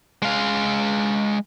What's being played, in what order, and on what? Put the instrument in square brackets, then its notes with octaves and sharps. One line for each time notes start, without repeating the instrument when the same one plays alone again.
[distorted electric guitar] G#3 F5